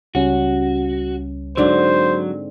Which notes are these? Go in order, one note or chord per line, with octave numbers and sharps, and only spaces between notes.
C#2 G3 C#4 F#4
G#2 D3 F#3 C4 C5